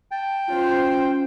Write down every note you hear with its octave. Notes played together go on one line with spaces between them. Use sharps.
G5 A5
C#4 F4 C5